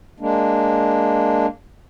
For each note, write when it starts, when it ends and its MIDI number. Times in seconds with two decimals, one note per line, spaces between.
0.20 1.46 56
0.20 1.46 58
0.20 1.46 62